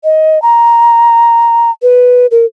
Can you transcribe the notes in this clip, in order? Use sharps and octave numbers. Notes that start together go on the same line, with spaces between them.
D#5
A#5
B4
A#4